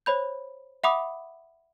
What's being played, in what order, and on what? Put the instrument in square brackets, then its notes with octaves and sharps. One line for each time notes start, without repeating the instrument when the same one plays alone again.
[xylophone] C5 C#5 B5 G6
E5 F#5 B5 D6 D#6